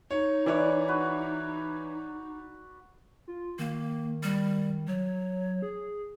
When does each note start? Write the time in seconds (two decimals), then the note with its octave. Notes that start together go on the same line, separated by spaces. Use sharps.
0.11 D#4 C#5
0.46 E3 E4 A#4 B4 C#5 D5
0.88 F#4 B4
3.28 F4
3.59 D#3 A#3
4.23 G3
4.88 F#3 C#5
5.62 G#4